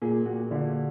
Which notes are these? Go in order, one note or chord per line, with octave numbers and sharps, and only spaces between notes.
A#2 G#4
A#2 F#4
D3 F4